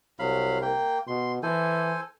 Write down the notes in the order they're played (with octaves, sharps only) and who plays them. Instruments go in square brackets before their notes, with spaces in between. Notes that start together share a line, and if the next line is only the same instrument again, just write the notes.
[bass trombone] C2 [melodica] F#3 F5 B5
[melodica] A#3 G5
[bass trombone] B2 [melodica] C6
[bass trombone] E3 [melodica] A4 C5 G#5